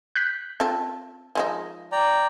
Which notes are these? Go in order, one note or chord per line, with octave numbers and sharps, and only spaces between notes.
F#6 G6 B6
C4 F4 A4
F3 G#3 D#4
D5 G5 A#5